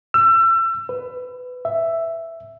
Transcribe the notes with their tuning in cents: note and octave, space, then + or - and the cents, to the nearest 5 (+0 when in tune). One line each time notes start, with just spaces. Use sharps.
E6 +30
B4 +15
E5 +5